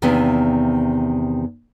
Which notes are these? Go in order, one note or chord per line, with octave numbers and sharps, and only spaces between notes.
E2 C3 D#3 A#3 B3 D4